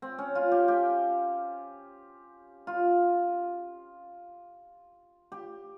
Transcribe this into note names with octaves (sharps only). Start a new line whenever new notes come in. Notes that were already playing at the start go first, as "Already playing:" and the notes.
C4
C#4
F4
G4
G4
F4
G4